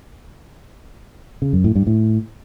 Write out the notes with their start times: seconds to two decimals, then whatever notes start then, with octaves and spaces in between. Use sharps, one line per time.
1.42 C#3
1.53 F#2
1.64 A2
1.75 G2
1.87 A2